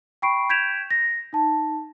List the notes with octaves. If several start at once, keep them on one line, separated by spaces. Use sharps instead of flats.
G5 B5 C#6 C7 D7
G6 G#6 B6 D7 E7 F7
A#6
D#4 A5